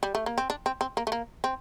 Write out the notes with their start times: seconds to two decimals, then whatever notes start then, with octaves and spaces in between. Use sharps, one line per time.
0.03 G3
0.15 A3
0.26 A#3
0.38 C4
0.50 D4
0.66 C4
0.81 C4
0.97 A#3
1.07 A3
1.12 A#3
1.44 C4